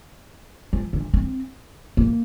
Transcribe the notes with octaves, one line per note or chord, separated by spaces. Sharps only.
F3
D3
C4
A#3